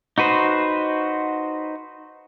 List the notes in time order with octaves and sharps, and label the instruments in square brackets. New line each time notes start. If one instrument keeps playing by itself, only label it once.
[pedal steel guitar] D#4 F#4 B4 C5